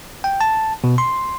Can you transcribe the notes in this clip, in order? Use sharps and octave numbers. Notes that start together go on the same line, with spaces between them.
G5
A5
B2
C6